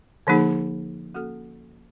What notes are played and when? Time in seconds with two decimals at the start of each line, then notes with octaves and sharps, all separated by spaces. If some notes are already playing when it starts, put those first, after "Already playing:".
0.27 D3 F3 A#3 D#4 G#4
1.14 A#3 C#4 F#4 A4